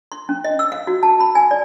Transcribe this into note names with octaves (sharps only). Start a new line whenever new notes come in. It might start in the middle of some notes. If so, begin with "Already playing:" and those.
C6
C#4
D#5
E6
F5
F#4
A5
B5
G#5
D5